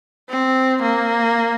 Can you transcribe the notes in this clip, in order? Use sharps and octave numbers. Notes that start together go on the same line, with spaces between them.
C4
A#3